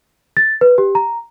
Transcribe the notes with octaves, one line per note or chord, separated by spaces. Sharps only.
A6
B4
G4
A#5